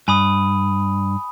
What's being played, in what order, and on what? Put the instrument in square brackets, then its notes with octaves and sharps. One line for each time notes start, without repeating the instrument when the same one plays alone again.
[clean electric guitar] G2 [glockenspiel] G#5 B5 D#6